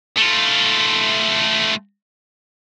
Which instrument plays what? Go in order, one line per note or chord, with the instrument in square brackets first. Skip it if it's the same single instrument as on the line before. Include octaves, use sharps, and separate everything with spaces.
[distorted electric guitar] A3 F4